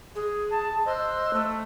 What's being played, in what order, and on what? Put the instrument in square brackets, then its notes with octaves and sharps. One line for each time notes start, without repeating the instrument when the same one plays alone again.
[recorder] G#4
[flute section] A5
[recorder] C5 [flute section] D#5 E6 F#6
[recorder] A3